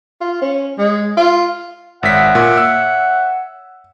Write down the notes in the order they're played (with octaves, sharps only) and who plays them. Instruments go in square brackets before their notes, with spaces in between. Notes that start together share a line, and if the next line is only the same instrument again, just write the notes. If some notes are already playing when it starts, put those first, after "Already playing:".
[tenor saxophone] F4
C#4
G#3
F4
[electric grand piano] G#1 B6 [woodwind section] C#5 E5 F#5
[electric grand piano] A#2
E6